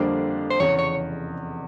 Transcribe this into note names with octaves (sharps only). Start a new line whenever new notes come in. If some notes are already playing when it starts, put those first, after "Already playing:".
Already playing: F2 D3 G3 A#3 D4 C5
C5
F1 E2 C#3 C#5
C#5